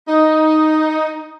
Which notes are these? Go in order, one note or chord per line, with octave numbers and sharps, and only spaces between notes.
D#4